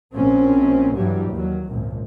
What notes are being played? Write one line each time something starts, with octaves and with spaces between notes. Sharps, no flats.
A#1 A#3 C4 C#4
G2 E3 F#3 G3
D#2 F#3
G#1 C#2 A#2